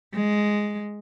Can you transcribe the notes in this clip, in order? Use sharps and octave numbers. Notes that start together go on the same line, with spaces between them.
G#3